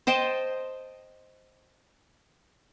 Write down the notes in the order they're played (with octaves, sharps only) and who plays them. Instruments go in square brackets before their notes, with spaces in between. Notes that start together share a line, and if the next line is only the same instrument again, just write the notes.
[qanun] C5 D#5 G5 A5